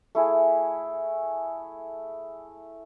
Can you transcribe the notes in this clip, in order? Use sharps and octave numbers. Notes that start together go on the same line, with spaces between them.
A3 E4 G#4